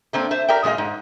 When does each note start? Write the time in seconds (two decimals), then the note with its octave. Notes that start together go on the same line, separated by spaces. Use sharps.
0.13 A3 A#3 C4 D4
0.31 C5 E5
0.48 G4 A#4 D5 E5 G5
0.63 A#2 G#3 F#4 D#5 F5
0.78 G#2